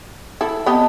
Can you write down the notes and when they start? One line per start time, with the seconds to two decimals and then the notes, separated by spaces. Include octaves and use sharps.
0.41 E4 A4
0.66 B3 C4 G4 D#5 A5